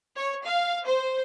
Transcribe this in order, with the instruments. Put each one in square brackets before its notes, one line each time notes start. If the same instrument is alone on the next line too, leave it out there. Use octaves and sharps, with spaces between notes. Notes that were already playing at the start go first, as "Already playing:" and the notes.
[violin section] C#5
F5
C5